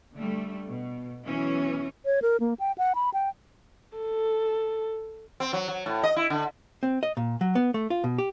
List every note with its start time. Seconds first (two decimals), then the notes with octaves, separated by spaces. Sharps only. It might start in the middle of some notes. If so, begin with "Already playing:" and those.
0.15 D3 G3 A3
0.67 B2
1.24 B2 E3 F#3 C#4
2.06 C#5
2.22 A#4
2.40 A#3
2.60 G5
2.78 F#5
2.95 B5
3.14 G5
3.97 A4
5.40 C4
5.53 F#3
5.68 F#3
5.86 A2
6.03 D#5
6.16 E4
6.30 D3
6.83 C4
7.03 D#5
7.17 A#2
7.41 F#3
7.55 B3
7.74 A3
7.90 F4
8.04 B2
8.18 G4